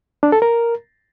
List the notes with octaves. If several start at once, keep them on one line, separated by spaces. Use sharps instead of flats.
D4
A4
A#4